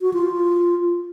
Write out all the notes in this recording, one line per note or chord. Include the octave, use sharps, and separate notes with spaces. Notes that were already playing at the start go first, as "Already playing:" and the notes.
F#4
F4